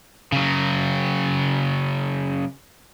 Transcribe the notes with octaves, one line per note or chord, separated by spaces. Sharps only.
C#3 F#3